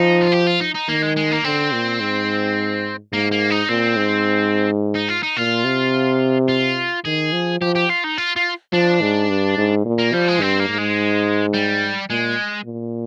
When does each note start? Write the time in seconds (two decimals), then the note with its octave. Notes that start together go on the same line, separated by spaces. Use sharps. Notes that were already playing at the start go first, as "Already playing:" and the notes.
Already playing: F3 D#4
0.22 F4
0.32 G4
0.47 F4
0.61 D#4
0.75 D#4
0.88 D#3 A#3
1.03 G#3
1.16 G#3
1.31 A#3
1.44 D3 C4
1.72 A#2
2.01 G#2
3.12 G#2 A#3
3.31 A#3
3.50 D#4
3.69 A#2 C4
3.97 G#2
4.95 D#4
5.09 F4
5.23 D#4
5.37 A#2 F4
5.65 C3
6.48 F4
7.05 D#3 G#4
7.33 F3
7.61 F3 G4
7.75 G4
7.89 F4
8.04 D#4
8.17 F4
8.36 F4
8.73 F3 D4
9.01 G#2
9.30 G2
9.58 G#2
9.85 A#2
9.99 A#3
10.13 F3 G3
10.28 G#3
10.41 G2 C4
10.60 A#3
10.69 G#2
10.78 G#3
11.54 G3
12.09 A#2 G#3
12.65 A#2